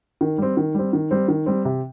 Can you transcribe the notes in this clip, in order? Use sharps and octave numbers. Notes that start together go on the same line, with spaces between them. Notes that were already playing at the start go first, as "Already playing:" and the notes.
D#3
G3 C4
D#3
G3 C4
D#3
G3 C4
D#3
G3 C4
C3